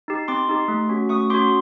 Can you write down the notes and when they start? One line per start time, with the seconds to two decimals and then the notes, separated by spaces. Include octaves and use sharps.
0.08 D#4 G4
0.28 C4 C6 D6
0.49 D#4 G4
0.68 A3
0.89 C#4 F#4
1.09 A3 C#6 D#6
1.30 C#4 F#4 C6 D6